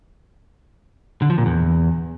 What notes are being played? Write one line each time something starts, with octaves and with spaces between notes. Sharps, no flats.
D3
F3
A#2
E2